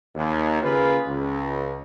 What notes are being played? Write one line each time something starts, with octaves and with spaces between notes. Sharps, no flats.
D#2
C#3 A#3 F4 G#4 A#4 B4
C#2